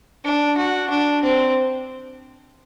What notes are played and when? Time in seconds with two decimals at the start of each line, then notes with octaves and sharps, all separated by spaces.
0.24 D4
0.57 F#4
0.90 D4
1.23 C4